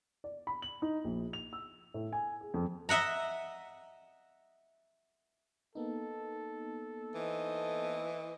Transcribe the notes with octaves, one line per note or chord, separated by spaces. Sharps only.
D5
B5
F#7
D#4
A#1
F7
E6
A2
G#5
G#4
F2
D#5 E5 F#5 A#5
A#3 B3 D#4 A4
E3 C5 D#5